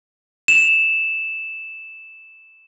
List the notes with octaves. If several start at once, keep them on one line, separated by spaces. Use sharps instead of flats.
E7 F7